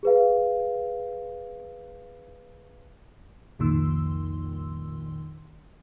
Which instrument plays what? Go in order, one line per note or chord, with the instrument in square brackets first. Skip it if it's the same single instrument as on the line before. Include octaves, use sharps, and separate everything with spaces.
[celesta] G#4 B4 F5
[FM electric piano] C2 F2 A#2 D#3 C6 E6